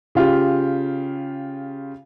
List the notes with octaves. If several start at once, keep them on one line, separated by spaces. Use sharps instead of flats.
C#3 F4 G4